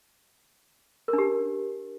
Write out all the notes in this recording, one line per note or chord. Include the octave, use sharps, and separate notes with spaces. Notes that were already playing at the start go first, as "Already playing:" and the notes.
A#4
D4
G4